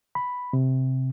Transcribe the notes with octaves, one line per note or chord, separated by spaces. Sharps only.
B5
C3